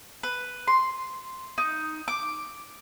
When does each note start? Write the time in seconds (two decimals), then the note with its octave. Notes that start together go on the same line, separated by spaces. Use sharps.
0.23 B4
0.68 C6
1.58 D#4
2.08 D6